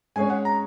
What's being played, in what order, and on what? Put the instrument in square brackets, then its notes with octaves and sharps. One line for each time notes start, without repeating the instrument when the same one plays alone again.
[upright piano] G#3 C#4 G#4 C#5 [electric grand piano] G#5
[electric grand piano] F#5
A#5